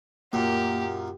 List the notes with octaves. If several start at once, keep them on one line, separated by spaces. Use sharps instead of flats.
F#2 A#2 A#3 G4